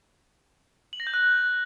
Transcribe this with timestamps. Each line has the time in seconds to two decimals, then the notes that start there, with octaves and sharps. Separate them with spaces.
0.93 F#7
1.00 A#6
1.07 G6
1.14 F#6